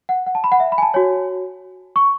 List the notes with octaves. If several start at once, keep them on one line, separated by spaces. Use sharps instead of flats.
F#5
F#5
A5
B5
F#5
E5
B5
G#5
A5
F#4 C#5 G#5
C#6